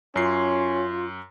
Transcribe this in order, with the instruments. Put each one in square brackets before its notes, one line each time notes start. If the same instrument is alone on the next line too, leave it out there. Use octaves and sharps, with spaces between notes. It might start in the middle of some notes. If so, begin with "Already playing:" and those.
[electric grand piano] F#2 C7 [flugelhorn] C#4 [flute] F4